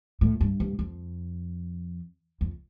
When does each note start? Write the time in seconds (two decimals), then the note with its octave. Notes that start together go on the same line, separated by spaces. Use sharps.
0.21 A2
0.41 G2
0.60 G2
0.79 F2
2.41 F2